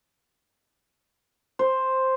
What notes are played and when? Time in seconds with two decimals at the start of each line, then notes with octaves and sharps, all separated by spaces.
1.59 C5